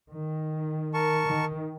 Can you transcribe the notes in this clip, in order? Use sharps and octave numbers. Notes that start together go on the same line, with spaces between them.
D#3
A#4 A5 C#6
D#3